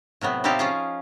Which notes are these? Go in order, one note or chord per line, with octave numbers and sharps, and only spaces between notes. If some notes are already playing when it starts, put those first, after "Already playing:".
A2 C3 F#3 B3
C4 D#4 E4 G4 A4 F5
F3 C#4 F4 G#4